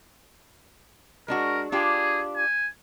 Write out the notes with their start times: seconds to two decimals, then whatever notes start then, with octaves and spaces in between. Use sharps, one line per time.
1.28 G#3 D4 F#4 A#4
1.72 D4 F4 G4 G#4
2.36 G#5